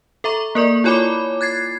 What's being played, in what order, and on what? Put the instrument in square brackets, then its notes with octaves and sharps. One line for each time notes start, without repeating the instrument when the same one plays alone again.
[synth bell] A4 E5 A#5 C#6
A#3 A#4 D5 C#6
E4 F4 C#5 G#5 B5 D6
F#6 G#6 A6 C7